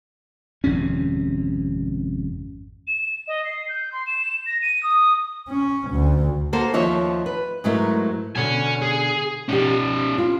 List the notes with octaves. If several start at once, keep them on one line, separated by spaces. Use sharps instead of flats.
G#1 F2 C3 C#4
E7
D#5
C7
G6
C6
E7
A#6
D#7
D#6
C#4
D2
A#3 F#4 A4 A#4 C5
D#2 F3 C#5 E5
B4
G#2 F#3 A3 E4 A#4
B2 D3 C#5 G#5
G#4
B2 C#4 D#4 G4
F4